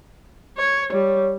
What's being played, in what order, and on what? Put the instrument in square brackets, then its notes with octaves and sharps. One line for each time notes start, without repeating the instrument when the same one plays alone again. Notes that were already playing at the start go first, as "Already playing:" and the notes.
[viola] C#5
[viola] G3 [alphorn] C#5